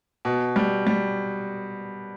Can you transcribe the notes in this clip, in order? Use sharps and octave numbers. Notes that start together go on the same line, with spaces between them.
B2
G3
G3